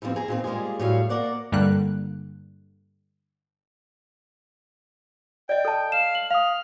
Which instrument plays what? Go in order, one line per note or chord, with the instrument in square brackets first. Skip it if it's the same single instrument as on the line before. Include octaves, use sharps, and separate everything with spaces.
[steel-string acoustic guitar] G2 E3 F3 G3 C4
G#4 A#5
A#2 D#3 C4
G3 G#3 A#3 F4 G#4
A2 F#3 G3 G#4 C#5 F5
A#3 A#4 D5 F#5
[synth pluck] G2 D3 G3 A#3 F#6
[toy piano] D5 D#5 [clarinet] G5
[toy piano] A4 A5
[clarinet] F5 [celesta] E7
[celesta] F#7
[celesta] F5 D#6 [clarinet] F6